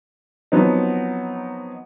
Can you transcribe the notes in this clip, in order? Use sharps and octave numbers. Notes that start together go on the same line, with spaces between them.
F3 F#3 B3 C4 D#4